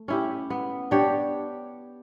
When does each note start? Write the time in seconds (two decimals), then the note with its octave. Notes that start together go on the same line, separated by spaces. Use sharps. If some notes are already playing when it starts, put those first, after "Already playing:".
Already playing: A3
0.08 C#4 E4 G4
0.50 B3
0.91 D4 G4 C#5